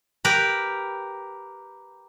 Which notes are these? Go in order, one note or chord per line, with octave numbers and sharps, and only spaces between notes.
G4 A#4 B4